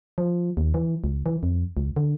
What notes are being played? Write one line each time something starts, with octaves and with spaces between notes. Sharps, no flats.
F3
D#2
E3
C#2
E3
F2
C#2
D3